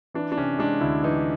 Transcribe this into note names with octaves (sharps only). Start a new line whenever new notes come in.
E3 D4
D4
C3 C#4
G#3 D4
D2 E4
E3 D#4